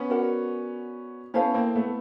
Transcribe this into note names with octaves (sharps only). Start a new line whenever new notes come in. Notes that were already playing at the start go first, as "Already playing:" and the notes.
Already playing: B3 C#4
F#4 A#4 D5 F#5
B3 C#4 E4 A4 C5 F5
A#3 C4
A3 B3